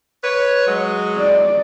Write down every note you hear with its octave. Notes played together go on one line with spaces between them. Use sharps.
B4 C#5
F#3 G#3
D5